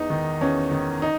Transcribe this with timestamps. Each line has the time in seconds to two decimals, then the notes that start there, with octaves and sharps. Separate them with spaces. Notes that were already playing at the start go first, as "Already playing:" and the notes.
Already playing: E2 D#4
0.10 D#3
0.41 E2 C#4
0.71 D#3
1.02 D#4